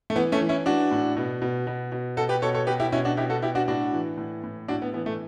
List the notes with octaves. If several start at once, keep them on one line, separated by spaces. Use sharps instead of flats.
A3
E3 B3
A3 C#4
E3
C#4 E4
E3 D4 F#4
A2
B2
B2
B2
B2
B2 F#4 A4
G4 B4
B2 A4 C#5
A4 C#5
B2 G4 B4
E4 G4
B2 C#4 E4
D4 F#4
B2 E4 G4
F#4 A4
B2 E4 G4
D4 F#4
A2 D4 F#4
E3
A2
A2
A2 D4 F#4
B3
E3 B3
A3